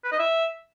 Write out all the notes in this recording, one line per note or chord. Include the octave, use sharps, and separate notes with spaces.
B4
D#5
E5